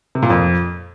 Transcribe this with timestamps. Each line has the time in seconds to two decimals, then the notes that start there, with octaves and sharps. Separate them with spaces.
0.15 C3
0.23 A#2
0.30 F2